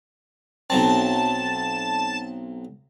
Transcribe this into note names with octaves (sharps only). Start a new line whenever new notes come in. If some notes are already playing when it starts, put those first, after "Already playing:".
B1 F#3 C4 A5